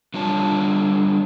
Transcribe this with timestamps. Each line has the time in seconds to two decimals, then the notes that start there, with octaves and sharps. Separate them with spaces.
0.14 D3 G3 F4 C#5 A5